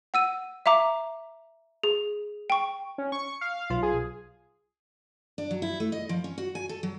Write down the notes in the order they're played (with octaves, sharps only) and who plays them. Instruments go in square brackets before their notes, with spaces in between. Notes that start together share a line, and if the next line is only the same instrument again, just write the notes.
[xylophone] F#5 E6 D#7
E5 F5 A#5 D6
G#4
G5 C#6
[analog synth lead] C#4
C#6
F5
[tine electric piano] B1 F4
[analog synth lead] G#4
[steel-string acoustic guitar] D4
F#3
E4
A3
D#5
F3
C#4
F#4
G#5
A4
F#3